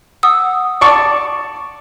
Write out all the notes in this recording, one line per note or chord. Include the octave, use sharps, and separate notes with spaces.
F#5 D#6 E6
D5 A5 C#6